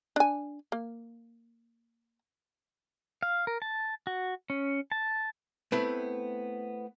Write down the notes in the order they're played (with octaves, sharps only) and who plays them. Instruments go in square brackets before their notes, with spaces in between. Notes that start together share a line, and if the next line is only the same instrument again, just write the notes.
[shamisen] D4 G#5
A#3
[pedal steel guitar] F5
A#4
A5
F#4
C#4
A5
[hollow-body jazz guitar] A3 B3 C4 E4 B4